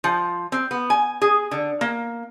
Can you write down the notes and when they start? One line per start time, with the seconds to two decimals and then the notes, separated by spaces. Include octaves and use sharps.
0.04 F3
0.52 C4
0.71 B3
0.90 G#5
1.22 G#4
1.51 D3
1.81 A#3